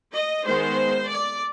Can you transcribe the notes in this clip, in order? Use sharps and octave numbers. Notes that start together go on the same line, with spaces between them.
D#5
D#3 G#3 B3 C5
D5